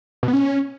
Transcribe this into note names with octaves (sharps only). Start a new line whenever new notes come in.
B2
B3
C#4